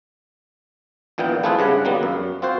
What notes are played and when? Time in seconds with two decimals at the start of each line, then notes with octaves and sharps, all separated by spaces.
1.18 A#1 A#2 E3 B3 G5
1.43 A3 C4 E4 F4 G#4 B4
1.59 G2 C#3 F#5
1.85 D#3 F#3 G3 A#3 B3
2.03 F#2
2.42 C4 F4 F#4 C5